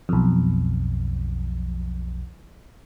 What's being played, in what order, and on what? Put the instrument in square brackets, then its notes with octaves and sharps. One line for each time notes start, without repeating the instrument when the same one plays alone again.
[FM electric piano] B1 F2